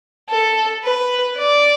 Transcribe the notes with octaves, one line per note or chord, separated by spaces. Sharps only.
A4
B4
D5